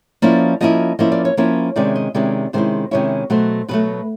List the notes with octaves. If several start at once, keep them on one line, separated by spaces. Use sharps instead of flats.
F3 A#3 C#4 E4 D5
F3 A#3 C#4 E4 D#5
F3 A#3 C#4 E4 D#5
D5
C#5
F3 A#3 C#4 E4 C#5
C3 D#3 G#3 C#4 E4 D5
D#5
C3 D#3 G#3 C#4 E4 D5
C3 D#3 G#3 C#4 E4 C5
C3 D#3 G#3 C#4 E4 C#5
B2 F#3 A3 C5
B2 F#3 A3 B4